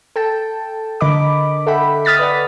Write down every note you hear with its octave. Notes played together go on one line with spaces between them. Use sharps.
A4 G5 A5
D3 A#4 D#5 B5 D6
A4 E5 F#5 G5 B5
D#6 F6 A6 B6
B4 D5 F#5